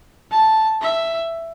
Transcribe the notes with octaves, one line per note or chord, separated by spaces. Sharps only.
A5
E5